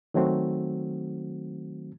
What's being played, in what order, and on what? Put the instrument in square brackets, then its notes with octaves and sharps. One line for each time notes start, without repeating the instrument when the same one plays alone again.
[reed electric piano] D#3 F#3 A3 C4 F#4